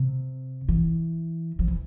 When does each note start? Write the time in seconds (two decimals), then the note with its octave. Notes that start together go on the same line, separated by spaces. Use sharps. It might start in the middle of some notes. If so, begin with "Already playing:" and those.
Already playing: C3
0.68 E3
1.59 F3
1.68 E3